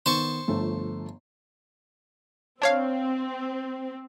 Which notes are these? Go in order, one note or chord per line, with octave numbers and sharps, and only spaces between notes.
D#3 B3 C5 A5 C#6
G1 F3 A3
C4 D4 C#5 F5